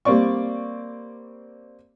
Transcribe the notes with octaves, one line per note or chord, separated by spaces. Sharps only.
G3 A#3 C4 D5 C#6